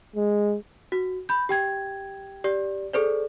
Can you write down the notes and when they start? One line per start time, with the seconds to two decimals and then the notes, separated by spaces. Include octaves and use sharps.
0.16 G#3
0.92 F#4
1.29 B5 G6
1.49 G4 G5 G#6
2.44 G4 D5
2.93 G#4 A4 C5 D5